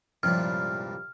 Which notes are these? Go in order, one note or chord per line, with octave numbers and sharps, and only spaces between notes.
C2 G2 A#2 F3 G#3 C#4 F6